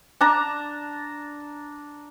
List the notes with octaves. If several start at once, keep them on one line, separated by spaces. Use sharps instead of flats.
D4 A5 A#5